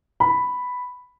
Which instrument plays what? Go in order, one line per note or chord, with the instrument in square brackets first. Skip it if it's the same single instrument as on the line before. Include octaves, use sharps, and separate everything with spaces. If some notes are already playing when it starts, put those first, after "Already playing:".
[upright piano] B5